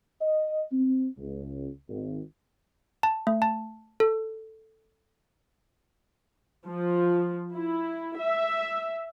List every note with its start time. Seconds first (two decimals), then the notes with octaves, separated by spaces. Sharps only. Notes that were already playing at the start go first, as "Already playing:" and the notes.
0.21 D#5
0.73 C4
1.18 C#2
1.89 G#1
3.03 A5
3.27 A3
3.42 A5
4.00 A4
6.67 F3
7.54 E4
8.18 E5